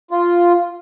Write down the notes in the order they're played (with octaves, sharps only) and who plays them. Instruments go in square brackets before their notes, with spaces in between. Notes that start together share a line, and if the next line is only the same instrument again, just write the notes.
[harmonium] F4